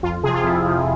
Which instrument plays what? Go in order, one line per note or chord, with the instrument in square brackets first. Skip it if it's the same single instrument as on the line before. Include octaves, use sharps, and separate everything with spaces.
[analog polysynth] F2 F4
C3 F3 G#4
F4
F2 E4
C3 F3